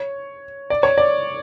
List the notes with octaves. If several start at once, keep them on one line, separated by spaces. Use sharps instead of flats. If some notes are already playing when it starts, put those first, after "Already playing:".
Already playing: C#5
D5
C#5
D5